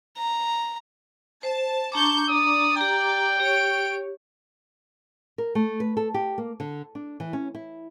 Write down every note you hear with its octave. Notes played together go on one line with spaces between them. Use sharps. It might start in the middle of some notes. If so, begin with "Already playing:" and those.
A#5
C5 A5
D4 A5 A#5 C#6 D6 G6
D5 D#6
G4 G5 A#5
G4 C#5 D7
A#4
A3
B4
A4
G4
A#3
D3
D4
E3
C#4
E4